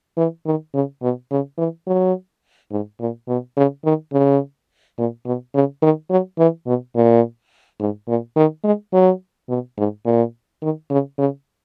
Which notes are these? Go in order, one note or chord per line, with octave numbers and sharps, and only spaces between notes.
E3
D#3
C#3
B2
C#3
E3
F#3
G#2
A#2
B2
C#3
D#3
C#3
A#2
B2
C#3
D#3
F#3
E3
B2
A#2
G#2
A#2
D#3
G#3
F#3
B2
G#2
A#2
D#3
C#3
C#3